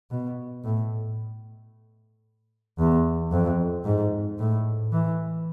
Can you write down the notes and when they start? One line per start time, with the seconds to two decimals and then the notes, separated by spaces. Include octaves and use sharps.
0.11 B2
0.64 A2
2.78 E2
3.32 F2
3.85 G#2
4.39 A2
4.92 E3